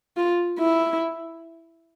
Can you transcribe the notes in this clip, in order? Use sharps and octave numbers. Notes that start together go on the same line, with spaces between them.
F4
E4